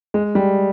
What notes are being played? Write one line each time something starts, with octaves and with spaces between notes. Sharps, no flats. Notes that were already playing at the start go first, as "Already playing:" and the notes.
G#3
G3